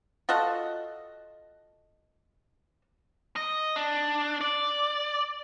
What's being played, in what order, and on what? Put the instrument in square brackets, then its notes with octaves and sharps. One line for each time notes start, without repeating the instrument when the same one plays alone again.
[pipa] F4 F#4 A4 D#5
[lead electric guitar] D#5
D4
D5